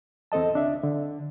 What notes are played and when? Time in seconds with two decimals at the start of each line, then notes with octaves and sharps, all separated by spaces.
0.32 E2 C4 A4 D#5 A5
0.53 C#2 D4 E5
0.83 D3